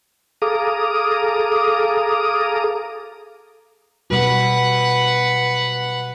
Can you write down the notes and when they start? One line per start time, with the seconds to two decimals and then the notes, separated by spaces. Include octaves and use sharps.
0.42 G#4 A4 F5 A#5 D6 D#6
4.10 B2 G3 F#4 B4 F#5